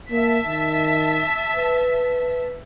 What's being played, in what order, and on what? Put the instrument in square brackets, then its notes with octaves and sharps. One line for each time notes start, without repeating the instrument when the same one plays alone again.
[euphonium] A#3 [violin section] E5 A5 B6
[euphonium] D#3
B4